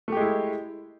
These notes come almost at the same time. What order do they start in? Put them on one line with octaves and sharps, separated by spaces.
A3 G4 G#3 E4